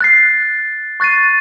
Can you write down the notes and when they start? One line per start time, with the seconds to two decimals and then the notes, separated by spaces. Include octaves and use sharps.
0.01 F#6 A6 C7
1.00 C#6 F#6 A6 C7 D#7